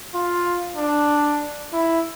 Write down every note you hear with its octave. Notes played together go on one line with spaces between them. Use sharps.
F4
D4
E4